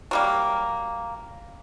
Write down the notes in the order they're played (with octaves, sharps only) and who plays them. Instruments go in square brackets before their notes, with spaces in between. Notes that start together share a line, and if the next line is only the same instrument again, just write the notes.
[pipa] F#3 G3 A#3